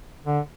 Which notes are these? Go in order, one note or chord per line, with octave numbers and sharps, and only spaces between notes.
D3